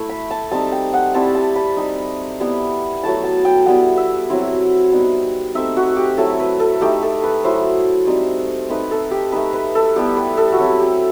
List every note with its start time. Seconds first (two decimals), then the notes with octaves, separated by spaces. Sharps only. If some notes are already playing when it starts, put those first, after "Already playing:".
Already playing: A3 E4
0.09 B5
0.31 A5
0.51 G3 C4 D#4 A5
0.72 G5
0.94 F#5
1.14 G3 C4 E4 A5
1.35 A5
1.56 B5
1.77 G3 D#4
2.40 G3 B3 E4
3.03 F#3 A3 E4 A5
3.24 A5
3.45 G5
3.66 G3 B3 E4 F#5
3.97 E5
4.30 F#3 C4 E4
4.92 G3 B3 D#4
5.55 A3 C4 D#4 E5
5.77 F#4
5.96 G4
6.17 F#3 A3 E4 A4
6.40 B4
6.60 A4
6.81 A3 D#4 G4
7.03 A4
7.24 B4
7.44 F#3 A3 E4 C5
8.07 G3 C4 D#4
8.69 A3 C4 D#4 B4
8.91 A4
9.11 G4
9.32 A3 D#4 B4
9.53 B4
9.75 A4
9.96 G3 B3 E4 G4
10.17 B4
10.37 A4
10.52 F#4
10.59 F#3 C4 E4 G4
10.80 G4